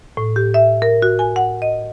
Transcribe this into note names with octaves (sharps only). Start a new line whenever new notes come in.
A2
G4
E5
A#4
F#4
G#5
F#5
D#5